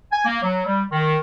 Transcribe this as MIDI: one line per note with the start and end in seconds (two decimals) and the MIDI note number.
0.12 0.24 80
0.26 0.39 58
0.43 0.63 54
0.66 0.82 55
0.92 1.16 51